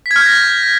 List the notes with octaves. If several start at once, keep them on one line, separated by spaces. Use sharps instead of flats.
B6
G#6
F6
G6
A#6